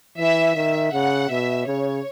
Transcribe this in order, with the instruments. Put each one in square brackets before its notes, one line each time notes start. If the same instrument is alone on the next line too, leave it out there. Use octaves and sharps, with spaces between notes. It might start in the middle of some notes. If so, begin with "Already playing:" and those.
[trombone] E3 [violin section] E5
[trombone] D#3 [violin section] E5
[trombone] C#3 [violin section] F#5
[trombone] B2 [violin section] E5
[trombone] C#3 [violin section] C#5